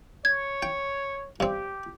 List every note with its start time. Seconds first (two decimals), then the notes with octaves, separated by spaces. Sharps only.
0.25 C#5 G#6
0.63 G5
1.40 G2 C4 G4